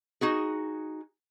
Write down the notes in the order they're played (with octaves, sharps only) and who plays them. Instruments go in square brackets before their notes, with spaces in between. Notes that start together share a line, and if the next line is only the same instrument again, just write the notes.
[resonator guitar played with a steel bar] D#4 F#4 G#4